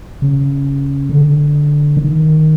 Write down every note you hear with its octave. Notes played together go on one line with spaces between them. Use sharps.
C#3
D3
D#3